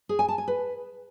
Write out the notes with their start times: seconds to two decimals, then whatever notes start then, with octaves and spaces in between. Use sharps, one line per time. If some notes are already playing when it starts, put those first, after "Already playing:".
0.09 G#4
0.19 G#5
0.28 A5
0.38 G#5
0.48 B4